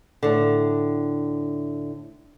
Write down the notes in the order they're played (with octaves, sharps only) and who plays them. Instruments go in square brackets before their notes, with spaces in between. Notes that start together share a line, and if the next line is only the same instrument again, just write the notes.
[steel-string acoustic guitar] A2 D3